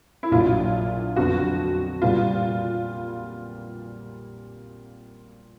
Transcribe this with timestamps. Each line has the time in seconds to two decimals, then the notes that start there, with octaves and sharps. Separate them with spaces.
0.23 E4
0.31 A#1 A#2 F#3 F4
1.16 F2 D3 F#3 B3 F#4
2.02 A#2 G3 B3 F4